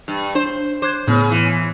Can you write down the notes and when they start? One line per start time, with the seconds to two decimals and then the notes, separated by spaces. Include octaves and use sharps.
0.08 G2
0.35 D4 C5
0.82 C5 D6 F#6 G#6
1.07 A2 C#3 B3 F6
1.31 E3